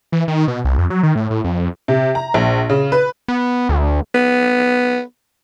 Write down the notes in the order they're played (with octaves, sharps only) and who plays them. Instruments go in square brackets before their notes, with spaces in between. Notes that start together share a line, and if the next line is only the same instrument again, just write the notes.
[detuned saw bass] E3
D#3
B2
C2
F2
F#3
D#3
A2
A2
F2
F2
[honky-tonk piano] C3
A#5
A#1
C#3
B4
[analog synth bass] B3
D2
[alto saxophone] B3